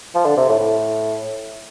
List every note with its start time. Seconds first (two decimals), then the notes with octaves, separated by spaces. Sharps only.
0.15 F3
0.25 D3
0.37 C3
0.49 A2
0.59 A2